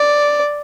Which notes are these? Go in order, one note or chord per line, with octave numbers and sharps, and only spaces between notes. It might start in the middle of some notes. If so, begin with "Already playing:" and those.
Already playing: D5